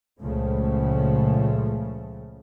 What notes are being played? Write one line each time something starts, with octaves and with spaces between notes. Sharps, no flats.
C#2 A#2 C#3 F3 A3